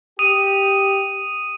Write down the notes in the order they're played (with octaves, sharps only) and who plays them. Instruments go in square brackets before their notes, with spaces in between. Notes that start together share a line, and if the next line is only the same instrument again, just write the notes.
[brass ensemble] G4 [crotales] D#6 D#7